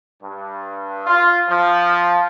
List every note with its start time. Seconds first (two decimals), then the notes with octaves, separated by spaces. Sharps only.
0.23 G2
1.07 F4
1.49 F3